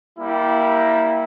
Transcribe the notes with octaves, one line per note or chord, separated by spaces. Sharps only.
G3 A#3 E4